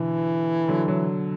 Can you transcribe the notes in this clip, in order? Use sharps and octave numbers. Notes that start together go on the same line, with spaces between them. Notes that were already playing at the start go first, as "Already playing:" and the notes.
Already playing: B2 D3 E3
D3 F#3
F#3